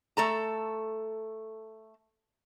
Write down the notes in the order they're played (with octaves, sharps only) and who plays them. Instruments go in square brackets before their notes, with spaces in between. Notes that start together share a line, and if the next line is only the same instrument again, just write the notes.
[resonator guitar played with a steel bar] A3 A4 A#5